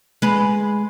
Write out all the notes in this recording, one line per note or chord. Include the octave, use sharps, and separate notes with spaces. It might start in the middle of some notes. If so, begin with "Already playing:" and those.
G#3 B4